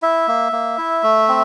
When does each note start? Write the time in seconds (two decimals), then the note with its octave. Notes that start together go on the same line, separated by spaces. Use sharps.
0.02 E4 E5
0.28 A#3
0.52 A#3
0.78 E4
1.03 A3
1.28 C4